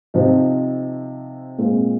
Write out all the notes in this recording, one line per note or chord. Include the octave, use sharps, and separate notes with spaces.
C3 F3 C4 D#4
A#2 G#3 C4 F4